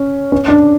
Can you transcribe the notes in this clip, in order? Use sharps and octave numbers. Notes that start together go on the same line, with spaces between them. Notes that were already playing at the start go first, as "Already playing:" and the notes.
Already playing: C#4
C#4
D4